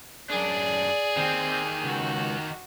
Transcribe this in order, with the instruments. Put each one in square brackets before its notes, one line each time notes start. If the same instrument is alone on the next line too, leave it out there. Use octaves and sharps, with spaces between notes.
[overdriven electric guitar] F#2 D4 [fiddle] G#4 [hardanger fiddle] D5
[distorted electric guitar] D#3 G4 [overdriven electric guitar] C4
[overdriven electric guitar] C#2 [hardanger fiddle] F#4